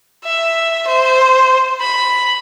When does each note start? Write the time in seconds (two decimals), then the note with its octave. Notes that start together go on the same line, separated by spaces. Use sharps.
0.24 E5
0.87 C5
1.81 B5